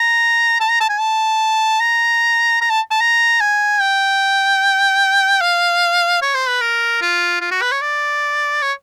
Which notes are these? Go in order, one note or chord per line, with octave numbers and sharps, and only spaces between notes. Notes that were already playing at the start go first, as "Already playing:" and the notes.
Already playing: A#5
A5
A#5
A5
G#5
A5
A#5
A#5
A5
A5
A#5
G#5
G5
F5
C#5
C5
B4
A#4
F4
F4
F#4
B4
C#5
D5
C#5